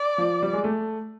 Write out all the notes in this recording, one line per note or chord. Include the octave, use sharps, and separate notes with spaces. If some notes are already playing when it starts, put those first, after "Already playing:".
Already playing: D5
F3
G3
G#3
A3